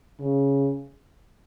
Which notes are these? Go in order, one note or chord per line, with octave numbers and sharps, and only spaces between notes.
C#3